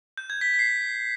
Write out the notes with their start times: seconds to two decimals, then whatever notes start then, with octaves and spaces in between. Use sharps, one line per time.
0.17 G6
0.30 G#6
0.41 B6
0.54 B6
0.59 C7